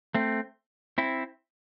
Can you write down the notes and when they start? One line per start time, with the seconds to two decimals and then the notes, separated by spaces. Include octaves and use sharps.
0.14 A3 C4
0.98 C4 E4